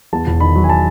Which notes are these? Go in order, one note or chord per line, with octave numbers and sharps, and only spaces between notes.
E2 A5
E1
D#3 B5
F#3
G#5
A5